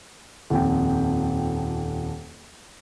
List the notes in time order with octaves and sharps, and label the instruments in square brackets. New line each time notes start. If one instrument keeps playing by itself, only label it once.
[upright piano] D#1 F2 G5